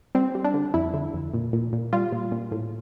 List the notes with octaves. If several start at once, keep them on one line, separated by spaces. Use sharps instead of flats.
G3 C4
G3
D4
D3
F2 E4
D3
F2
A#2
A#2
A#2
G3 F4
A#2
A#2
A2